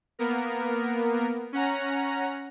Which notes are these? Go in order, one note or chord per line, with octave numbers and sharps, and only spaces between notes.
A#3 B3 A#4
C#4 F#5 A#5